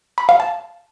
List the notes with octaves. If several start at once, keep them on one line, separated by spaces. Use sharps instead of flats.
B5
F5
A5